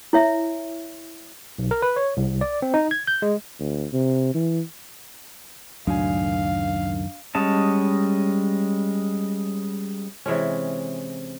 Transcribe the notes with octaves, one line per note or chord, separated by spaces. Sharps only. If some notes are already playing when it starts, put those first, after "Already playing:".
E4 C#5 E5
B1
A#4
B4
C#5
C2
D5
C4
D#4
G#6
G6
G#3
D2
C3
E3
C#2 F#2 A2 D#3 F#3 D4 F5 G#5
G3 G#3 C#4 D#5 A5
C3 E3 G#3 C#4